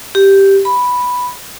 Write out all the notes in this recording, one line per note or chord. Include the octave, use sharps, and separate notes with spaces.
G4
B5